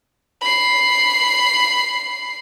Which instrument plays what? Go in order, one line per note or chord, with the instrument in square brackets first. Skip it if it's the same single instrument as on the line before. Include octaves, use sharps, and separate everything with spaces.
[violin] B5 C7